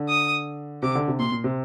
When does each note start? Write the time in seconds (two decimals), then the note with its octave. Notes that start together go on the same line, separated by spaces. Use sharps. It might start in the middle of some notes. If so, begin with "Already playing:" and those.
Already playing: D3
0.09 D#6
0.83 C3 D6
0.95 D3
1.08 C3
1.19 A#2 C6
1.32 A#2
1.44 C3